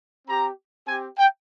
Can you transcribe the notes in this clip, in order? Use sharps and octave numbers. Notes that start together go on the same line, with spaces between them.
C4 G4 A#5
C4 G4 G#5
G5